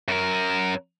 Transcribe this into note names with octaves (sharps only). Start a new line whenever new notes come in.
F#2 A#4